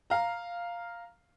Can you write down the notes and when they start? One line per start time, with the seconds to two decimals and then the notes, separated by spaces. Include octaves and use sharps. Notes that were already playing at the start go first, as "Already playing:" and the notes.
0.10 F5 A#5